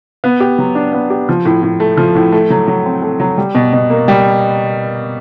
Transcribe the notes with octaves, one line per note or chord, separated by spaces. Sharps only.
B3
G4
F#3
D4
B3
G4
F3
A2
A2
A3
F3
A2
A3
F#3
F#3
C4
A3
F#3
G3
B2
B2
A#3
G3